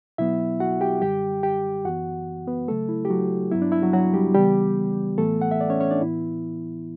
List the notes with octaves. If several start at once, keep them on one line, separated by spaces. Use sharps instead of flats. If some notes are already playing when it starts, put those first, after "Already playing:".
B2 F#3 B3 E4 E5
F#4 F#5
G4 G5
F#2 D3 G3 G4 G5
G4 G5
F#2 E3 B3 F#4 F#5
B3 B4
C#3 F#3 A3 A4
E4
G4
F#3 F#4
G2 F#3 B3 E4
D4
E4
F#3 F#4
F#3 F#4
G3 G4
C#3 E3 G3 B3 G4
A2 E3 A3 B3 A4
F#5
E5
D5
C#4 C#5
C#4 C#5
D4 D5
A2 E3 B3 E4